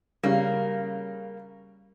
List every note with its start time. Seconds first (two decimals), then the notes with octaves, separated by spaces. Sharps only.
0.23 C#3 G3 A#3